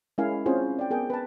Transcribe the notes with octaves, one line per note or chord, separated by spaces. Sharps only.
G#3 C#4 E4 A#4 F5 G#5
C4 C#4 E4 F4 G#4 C5
D5 G5
B3 G#4 A#4 G5
B4 A5